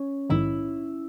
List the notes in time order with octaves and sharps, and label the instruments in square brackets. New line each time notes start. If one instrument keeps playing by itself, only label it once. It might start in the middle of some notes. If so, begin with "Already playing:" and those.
Already playing: [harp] C#4
[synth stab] A#1 G#2 D#3 [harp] E4